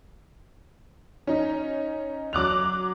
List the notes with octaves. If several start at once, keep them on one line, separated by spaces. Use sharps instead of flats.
C#4 D#4
F#3 D6 F#6 F7